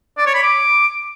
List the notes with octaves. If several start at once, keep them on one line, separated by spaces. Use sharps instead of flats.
D5
C#5
B5
D6